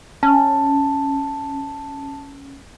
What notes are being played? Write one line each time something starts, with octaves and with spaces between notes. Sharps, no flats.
C#4 A5